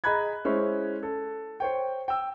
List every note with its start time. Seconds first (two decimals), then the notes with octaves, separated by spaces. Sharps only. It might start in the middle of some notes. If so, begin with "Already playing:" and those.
0.04 G#4 D#5 A#5 B5 F#6 G#6
0.45 G#3 C#4 E4 C5
1.03 A4
1.60 C5 C#5 G5
2.08 G5 E6